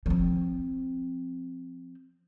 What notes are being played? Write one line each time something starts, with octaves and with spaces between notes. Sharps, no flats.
F3 C4